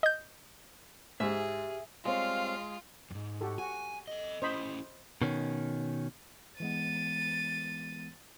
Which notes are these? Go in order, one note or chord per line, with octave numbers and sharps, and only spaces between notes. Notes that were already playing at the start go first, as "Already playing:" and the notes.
D#5 G6
G#2 G4 G#4 E5 F6
G3 G#3 C4 F4 C#5 F5
F2 G#2
F#4 G4 A4
F#4 G#5
A4 D#5
C#4 E4 G4 C5 D#5 B5
B2 D#3 C#4
E3 G#3 B3 A6 D#7